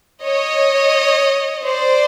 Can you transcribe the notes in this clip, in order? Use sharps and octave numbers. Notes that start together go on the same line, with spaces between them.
C#5 D#5
C5 D5